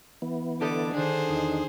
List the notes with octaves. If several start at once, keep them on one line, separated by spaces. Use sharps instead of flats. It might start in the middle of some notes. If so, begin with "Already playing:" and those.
E3 B3
D3 G4 A4 D#5 D6
D#3 D4 G#4 C5
E2 D#4